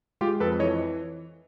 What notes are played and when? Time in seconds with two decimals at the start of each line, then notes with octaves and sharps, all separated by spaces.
0.21 G#3 F4 G4
0.40 F2 A4 B4
0.60 E3 C#5 D#5